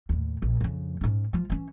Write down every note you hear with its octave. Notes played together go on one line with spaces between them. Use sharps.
D#2 A2
A#1
F2 C#3
G#2 C#4
F3 F4
E3 C#4